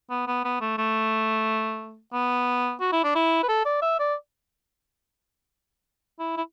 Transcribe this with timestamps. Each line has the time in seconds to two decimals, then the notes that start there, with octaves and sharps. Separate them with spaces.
0.10 B3
0.27 B3
0.45 B3
0.61 A3
0.78 A3
2.13 B3
2.81 F#4
2.92 E4
3.04 D4
3.15 E4
3.43 B4
3.49 A4
3.65 D5
3.82 E5
4.00 D5
6.19 E4
6.37 E4